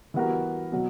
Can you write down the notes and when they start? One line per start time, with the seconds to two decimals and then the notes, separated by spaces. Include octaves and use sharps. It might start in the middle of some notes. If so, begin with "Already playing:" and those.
0.14 E3 G3 B3 F#4 A#4
0.72 B2 F#3